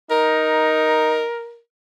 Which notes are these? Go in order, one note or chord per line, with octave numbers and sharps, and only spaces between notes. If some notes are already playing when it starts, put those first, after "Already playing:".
D#4 A#4